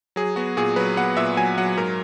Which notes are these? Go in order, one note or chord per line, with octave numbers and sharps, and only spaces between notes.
F#3 G#4
B3 F#4
A#2 G#4
F#3 B4
B3 F#5
A#2 E5
F#3 G#5
F#3 F#5
G#2 A#4